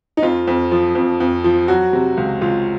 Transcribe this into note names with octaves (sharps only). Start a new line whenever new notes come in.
D#4
F2 F4
F2
F3
F2
F2
F3
F#3 F#4
C3
C#2
C#2 F4